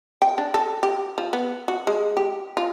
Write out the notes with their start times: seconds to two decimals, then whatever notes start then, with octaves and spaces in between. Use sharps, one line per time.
0.22 G5
0.38 D4
0.54 A4
0.83 G4
1.18 F3
1.33 B3
1.68 F#4
1.87 G#3
2.17 G4
2.57 F4